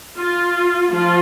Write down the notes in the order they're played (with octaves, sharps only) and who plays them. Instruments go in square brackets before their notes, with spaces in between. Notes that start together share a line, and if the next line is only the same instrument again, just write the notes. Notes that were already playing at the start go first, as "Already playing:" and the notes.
[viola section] F4
F3 F4